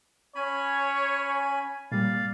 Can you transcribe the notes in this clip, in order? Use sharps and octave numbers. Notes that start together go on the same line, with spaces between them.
C#4 C#5 G#5 B5
A#2 G3 D5 F5